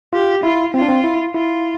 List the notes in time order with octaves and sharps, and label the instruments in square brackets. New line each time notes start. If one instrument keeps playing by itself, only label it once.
[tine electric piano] F4 [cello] G4
[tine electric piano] E4 [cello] F4
[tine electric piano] C4 [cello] F4
[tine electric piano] D4
C4
E4
[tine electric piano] E4 [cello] F4